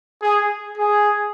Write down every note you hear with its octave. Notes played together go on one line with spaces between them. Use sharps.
G#4
G#4